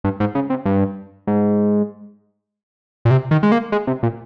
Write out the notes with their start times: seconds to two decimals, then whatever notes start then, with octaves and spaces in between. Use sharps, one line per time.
0.04 G2
0.20 G#2
0.35 C#3
0.50 C3
0.65 G2
1.27 G#2
3.05 A#2
3.11 C3
3.31 D#3
3.43 G#3
3.52 A#3
3.72 G#3
3.87 C3
4.03 A#2